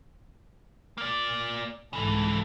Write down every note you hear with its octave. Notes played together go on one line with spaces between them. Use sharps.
A#3 D5
C2 G#2 C#3 E3 A4